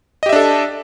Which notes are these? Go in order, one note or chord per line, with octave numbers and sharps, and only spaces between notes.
D4 G4 A4 D#5 E5